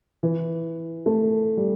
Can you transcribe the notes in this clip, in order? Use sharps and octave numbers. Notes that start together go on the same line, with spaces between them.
E3
A3
G3